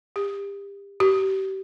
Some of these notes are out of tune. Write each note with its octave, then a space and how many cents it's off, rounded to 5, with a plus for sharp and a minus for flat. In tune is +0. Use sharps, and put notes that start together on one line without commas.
G4 +30
G4 -35